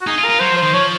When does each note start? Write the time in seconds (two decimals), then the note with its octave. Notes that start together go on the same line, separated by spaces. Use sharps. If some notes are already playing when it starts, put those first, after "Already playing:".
0.01 F#4
0.07 D#4 G#4
0.18 F4
0.24 A#4
0.29 F4
0.40 F#3 C5
0.51 F3
0.57 C5
0.62 D#3
0.73 F3 C#5